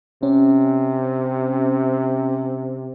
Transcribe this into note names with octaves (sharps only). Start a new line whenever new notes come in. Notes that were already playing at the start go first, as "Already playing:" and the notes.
C3 C#4